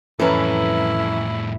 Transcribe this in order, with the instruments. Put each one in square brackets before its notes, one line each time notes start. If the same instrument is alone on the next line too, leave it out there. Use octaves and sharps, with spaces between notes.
[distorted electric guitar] F2 A2 [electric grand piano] E3 C#4 A#5 [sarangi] E4 [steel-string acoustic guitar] A4 B4